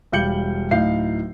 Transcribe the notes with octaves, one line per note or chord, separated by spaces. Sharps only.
E1 G3 F5 G6 C#7 F#7
D1 A2 D#4 F5 G6 C7